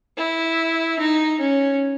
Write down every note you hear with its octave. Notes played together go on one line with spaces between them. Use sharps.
E4
D#4
C#4